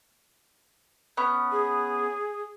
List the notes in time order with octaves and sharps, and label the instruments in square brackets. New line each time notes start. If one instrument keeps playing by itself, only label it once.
[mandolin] B3 C#4
[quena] G#4